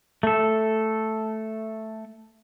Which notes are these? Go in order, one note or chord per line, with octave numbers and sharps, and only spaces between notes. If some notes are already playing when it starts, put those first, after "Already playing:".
A3 A4